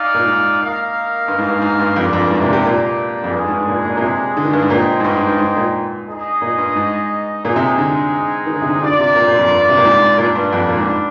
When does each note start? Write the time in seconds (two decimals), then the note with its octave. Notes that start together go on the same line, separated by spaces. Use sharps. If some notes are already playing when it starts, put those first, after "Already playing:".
Already playing: D#4 G#4 D5 F5
0.14 A#2
0.25 G#2
0.59 A#3 D#4 A#4 F5
1.28 G2
1.38 G#2
1.49 G2
1.62 G#2
1.79 G2
1.96 F2 A#3 D4 G4 A#4 D5
2.05 G2
2.13 F2
2.21 G2
2.30 G#2
2.41 C3
2.48 A#2
2.53 C3
2.65 A#2
3.24 F2
3.33 G2 G#3 D4 G#4
3.47 G#2
3.50 G2
3.68 A#2
3.85 A#2
3.97 A#2
4.01 C3
4.37 D3
4.45 D#3
4.53 G2
4.62 G#2
4.70 A#2 D#4 G#4 C5 D#5 G5
5.00 G#2
5.05 G2
5.17 G#2
5.27 G2
5.39 G#2
5.57 A#2
6.07 D#4 G#4 D#5
6.42 A#2
6.58 G2
6.76 G#2
7.44 A#2 G#3 C4 D#4 G#4
7.56 C3
7.78 D3
8.46 D#3
8.54 D3
8.62 C3
8.69 D3
8.81 D3 F4 A#4 D5
8.99 C3
9.15 A#2
9.27 A#2
9.38 F2
9.50 G2
9.69 C3
9.77 A#2
9.85 G#2
10.18 A#2 G3 A#3 D4
10.35 G2
10.53 F2
10.69 A#2
10.77 G#2